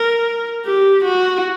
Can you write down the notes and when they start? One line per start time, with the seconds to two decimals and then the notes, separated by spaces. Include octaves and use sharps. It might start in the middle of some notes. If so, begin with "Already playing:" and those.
Already playing: A#4
0.65 G4
1.05 F#4